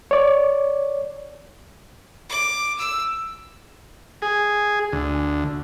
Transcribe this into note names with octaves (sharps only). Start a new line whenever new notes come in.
C#5 D5
D6
E6
G#4
D2